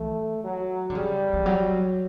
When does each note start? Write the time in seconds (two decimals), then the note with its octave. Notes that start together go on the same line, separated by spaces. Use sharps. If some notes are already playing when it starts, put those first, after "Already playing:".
Already playing: E3 A3
0.44 F#3
0.90 D3
0.95 C#3 G3
1.33 E3
1.46 F#3